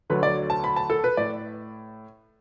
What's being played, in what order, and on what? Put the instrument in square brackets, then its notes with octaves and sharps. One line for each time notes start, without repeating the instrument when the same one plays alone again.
[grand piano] D2 D3 F#3 B4
D5
A5
B5
A5
A4
B4
A2 D5